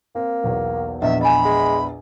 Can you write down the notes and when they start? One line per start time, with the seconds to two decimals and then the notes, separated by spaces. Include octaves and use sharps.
0.15 A#3 C4
0.44 B1 E2
1.02 A#1 E2 D#5 E5
1.21 D#5 G#5 B5
1.45 G#3